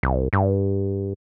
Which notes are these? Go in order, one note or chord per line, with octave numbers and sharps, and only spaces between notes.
C2
G2